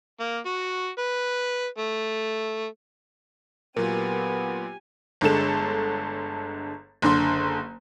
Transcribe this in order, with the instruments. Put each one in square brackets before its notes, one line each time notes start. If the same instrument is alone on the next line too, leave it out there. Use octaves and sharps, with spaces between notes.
[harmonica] A#3
F#4
B4
A3
[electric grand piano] A#2 F#3 F4 [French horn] B3 [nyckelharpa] G4 G#5 [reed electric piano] A#4
[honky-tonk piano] G1 D3 G#3 A4 E7
F#1 D3 C6